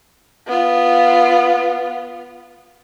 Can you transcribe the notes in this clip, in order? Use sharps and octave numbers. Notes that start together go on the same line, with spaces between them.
B3 F4